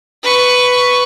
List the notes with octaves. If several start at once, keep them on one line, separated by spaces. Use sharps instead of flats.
B4 C#6